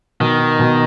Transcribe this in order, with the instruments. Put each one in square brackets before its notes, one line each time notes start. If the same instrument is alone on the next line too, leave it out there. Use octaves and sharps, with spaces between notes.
[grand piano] B2 [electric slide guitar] D#3
[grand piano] D#4
B2